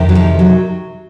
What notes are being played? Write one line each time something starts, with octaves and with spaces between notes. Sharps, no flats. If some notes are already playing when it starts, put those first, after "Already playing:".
Already playing: F2 C3 D#3
F#3
F3
F#3